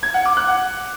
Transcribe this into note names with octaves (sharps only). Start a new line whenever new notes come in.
G#6
F#5
D6
F#6
F#5